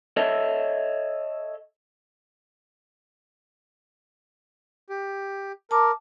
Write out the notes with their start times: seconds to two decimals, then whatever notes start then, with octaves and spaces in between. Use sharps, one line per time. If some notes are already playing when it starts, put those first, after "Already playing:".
0.17 A4 C#5 D#5 E5 A5
4.90 G4
5.71 A#4 A5 D6